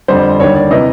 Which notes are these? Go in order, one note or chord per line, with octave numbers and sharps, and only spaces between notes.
F2 D3 G3 C5
D#2 D3 G3 C#5
D5
C3 E3 D#5